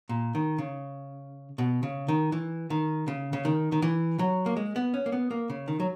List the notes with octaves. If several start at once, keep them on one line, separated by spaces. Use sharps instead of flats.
A#2
D#3
C#3
B2
C#3
D#3
E3
D#3
C#3
C#3
D#3
D#3
E3
F#3
A#3
G#3
B3
C#4
A#3
B3
A#3
C#3
D#3
F#3